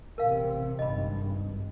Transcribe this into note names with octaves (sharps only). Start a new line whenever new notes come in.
A1 C3 A#4 F5
G#1 G2 D#5 B5